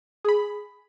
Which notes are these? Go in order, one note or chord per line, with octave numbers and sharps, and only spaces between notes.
G#4 B5